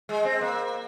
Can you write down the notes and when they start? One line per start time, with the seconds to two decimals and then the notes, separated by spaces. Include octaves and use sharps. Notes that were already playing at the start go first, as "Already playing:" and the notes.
0.09 G#3
0.25 C4
0.41 A#3